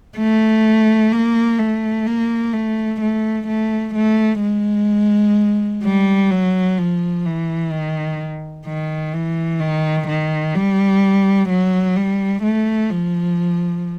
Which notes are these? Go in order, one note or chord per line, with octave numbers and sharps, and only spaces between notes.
A3
A#3
A3
A#3
A3
A3
A3
A3
G#3
G3
F#3
F3
E3
D#3
D#3
E3
D#3
D#3
G3
F#3
G3
A3
F3